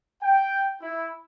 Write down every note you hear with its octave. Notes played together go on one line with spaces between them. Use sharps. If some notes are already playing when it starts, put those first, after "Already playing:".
G5
E4